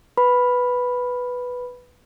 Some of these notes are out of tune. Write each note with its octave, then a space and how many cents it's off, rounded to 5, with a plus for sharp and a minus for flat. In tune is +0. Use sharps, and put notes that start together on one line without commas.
B4 +0 B5 +0